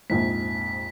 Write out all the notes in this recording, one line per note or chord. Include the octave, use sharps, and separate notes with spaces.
A#1 F2 G#2 B6